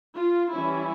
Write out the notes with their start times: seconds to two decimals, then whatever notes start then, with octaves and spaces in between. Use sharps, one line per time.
0.16 F4
0.54 E3 G3 C#4 E4